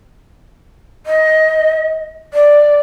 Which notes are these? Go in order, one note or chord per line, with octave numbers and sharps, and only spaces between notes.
D#5
D5